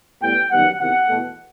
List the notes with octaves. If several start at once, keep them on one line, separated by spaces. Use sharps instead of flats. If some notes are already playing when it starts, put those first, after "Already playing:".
A2 G3 B3 G5
F#2 D#3 G3 B3 F#5
E2 C3 D#3 F#5
E2 B2 A3